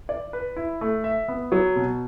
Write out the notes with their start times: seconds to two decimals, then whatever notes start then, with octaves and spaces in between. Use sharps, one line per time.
0.09 D5
0.33 B4
0.56 E4
0.81 A3
1.04 E5
1.28 B3
1.52 F#3
1.76 B2